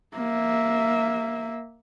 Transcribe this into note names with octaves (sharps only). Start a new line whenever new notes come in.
A#3 E5